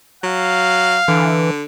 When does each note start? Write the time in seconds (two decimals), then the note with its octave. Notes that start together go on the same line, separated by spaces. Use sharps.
0.24 F#3 F5
1.08 D3 E3